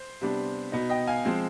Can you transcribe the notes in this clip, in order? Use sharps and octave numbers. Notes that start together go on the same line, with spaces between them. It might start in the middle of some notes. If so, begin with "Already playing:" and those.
Already playing: C5
C3 G3 B3 D4
B2 B3 D#4
D#5 G5
F5 G#5
F3 G#3 C4